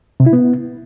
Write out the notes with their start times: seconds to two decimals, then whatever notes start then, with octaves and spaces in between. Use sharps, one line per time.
0.20 C3
0.26 E4
0.33 B3